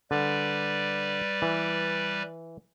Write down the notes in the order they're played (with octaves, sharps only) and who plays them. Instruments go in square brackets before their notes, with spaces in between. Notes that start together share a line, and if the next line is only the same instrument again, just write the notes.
[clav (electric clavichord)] D3 [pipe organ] G3 B4 D5
[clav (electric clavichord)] E3